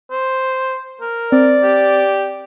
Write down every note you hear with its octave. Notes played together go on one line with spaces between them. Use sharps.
C5
A#4
C4 D5
G4